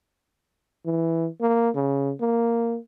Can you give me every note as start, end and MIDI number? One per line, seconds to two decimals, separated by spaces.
0.86 1.28 52
1.41 1.70 58
1.75 2.13 49
2.21 2.79 58